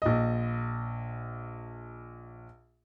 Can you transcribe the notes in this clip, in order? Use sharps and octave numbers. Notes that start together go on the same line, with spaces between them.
A#1 D#5